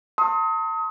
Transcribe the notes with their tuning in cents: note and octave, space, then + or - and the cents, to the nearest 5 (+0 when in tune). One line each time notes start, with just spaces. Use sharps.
A5 +45 C6 +30 D#6 +35